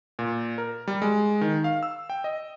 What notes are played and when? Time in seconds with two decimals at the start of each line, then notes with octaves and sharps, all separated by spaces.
0.19 A#2
0.58 A#4
0.88 G3
1.02 G#3
1.41 D#3
1.64 F5
1.83 E6
2.10 G5
2.24 D#5